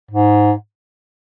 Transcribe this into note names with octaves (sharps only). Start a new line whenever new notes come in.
G#2